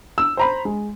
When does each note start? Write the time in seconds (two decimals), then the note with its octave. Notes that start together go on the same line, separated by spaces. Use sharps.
0.18 E6
0.37 C5 A#5 B5
0.65 G#3